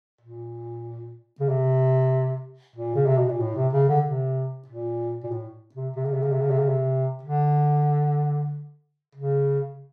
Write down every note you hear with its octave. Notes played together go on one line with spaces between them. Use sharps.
A#2
C#3
C3
A#2
C#3
C3
B2
A#2
A2
C3
C#3
D3
C3
A#2
A#2
A2
C3
C3
C#3
C3
C#3
C3
C#3
C3
C#3
C3
D3
C#3